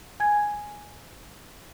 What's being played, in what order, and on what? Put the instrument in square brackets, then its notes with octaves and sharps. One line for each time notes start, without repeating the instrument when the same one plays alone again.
[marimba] G#5 G#6